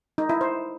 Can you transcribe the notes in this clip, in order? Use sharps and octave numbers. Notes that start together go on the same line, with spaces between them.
D#4
E4
C5